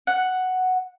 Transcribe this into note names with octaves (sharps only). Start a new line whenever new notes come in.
F#5